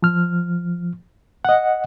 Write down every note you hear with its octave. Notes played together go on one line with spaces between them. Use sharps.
F3 F6
D#5 F#5